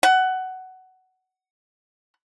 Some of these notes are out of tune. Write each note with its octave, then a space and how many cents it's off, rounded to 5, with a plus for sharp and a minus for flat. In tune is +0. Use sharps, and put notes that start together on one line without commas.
F#5 +15